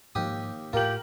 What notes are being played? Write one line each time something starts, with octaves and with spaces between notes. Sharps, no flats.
D#2 G#2 F3 G4 D#6
A2 F4 G4 A#4 F#7